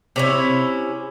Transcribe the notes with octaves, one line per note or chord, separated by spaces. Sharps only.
C3 C#4 E4